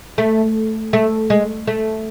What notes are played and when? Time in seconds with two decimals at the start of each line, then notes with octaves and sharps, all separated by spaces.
0.18 A3
0.93 A3
1.30 G#3
1.67 A3